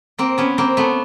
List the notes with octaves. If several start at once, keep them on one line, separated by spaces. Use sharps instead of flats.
A#3 C4
B3 C#4
A#3 C4
A3 B3